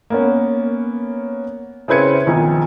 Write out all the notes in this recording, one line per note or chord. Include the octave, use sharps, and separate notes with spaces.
A#3 B3 C#4
C#3 C4 E4 B4 G#6 C#7
B1 D#3 F3